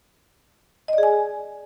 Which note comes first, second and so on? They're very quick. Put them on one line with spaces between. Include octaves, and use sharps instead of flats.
D#5 D5 G#4 G#5